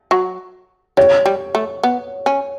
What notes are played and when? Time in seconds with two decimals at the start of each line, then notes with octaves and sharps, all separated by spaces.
0.11 F#3
0.97 G3 C#5
1.26 G3
1.55 A3
1.83 B3
2.26 C#4